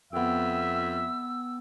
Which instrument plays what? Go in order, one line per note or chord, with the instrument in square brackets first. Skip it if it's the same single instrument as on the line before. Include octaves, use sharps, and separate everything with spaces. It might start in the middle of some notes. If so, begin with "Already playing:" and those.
[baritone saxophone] F2 [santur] B3 G5 [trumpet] E5 [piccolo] E6